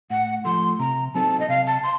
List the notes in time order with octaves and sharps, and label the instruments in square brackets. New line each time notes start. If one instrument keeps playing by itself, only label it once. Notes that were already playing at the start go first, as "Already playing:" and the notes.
[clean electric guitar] A2 [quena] F#5
[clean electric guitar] F3 A3 [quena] C6
[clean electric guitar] C3 [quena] A#5
[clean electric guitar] F#3 C4 D#4 A4 [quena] A5
[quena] D#5
[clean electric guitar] C3 [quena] F5
[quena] A5
C6